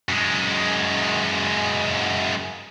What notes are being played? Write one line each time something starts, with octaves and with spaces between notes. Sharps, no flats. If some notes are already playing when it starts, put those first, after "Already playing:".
F#2 G#3